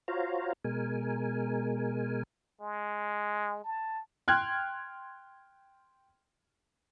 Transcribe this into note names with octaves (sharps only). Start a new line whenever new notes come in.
F4 F#4 C5 C#5 F5 A#5
B2 G#3 A#4 G#5
G#3
A5
G5 C6 F6 F#6 G#6